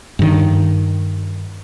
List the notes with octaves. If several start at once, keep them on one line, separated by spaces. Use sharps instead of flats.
G2 D#3